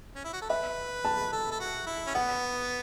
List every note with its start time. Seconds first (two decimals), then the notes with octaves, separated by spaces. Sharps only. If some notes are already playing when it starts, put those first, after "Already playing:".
0.16 C#4
0.24 E4
0.33 F#4
0.42 A4
0.50 B4 E5
1.05 A5
1.33 A4
1.52 A4
1.60 F#4
1.87 E4
2.07 C#4
2.15 B3 F#5